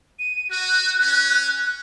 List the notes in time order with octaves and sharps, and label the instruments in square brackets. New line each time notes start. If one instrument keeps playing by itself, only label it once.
[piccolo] D#7
[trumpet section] F#4 [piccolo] F#6
[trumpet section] C#4